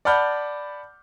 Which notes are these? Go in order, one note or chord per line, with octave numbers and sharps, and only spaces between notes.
D5 F#5 A5 B5 F6 G6